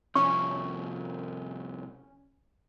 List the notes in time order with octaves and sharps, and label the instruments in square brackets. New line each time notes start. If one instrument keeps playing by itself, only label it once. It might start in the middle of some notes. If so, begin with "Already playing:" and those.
[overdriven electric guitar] C2 F3 [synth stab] C#4 [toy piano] C#6